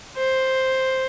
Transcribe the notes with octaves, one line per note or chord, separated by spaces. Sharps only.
C5